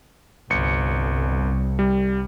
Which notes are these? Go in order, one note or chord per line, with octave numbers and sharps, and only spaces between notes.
G1 C2 C#7
G3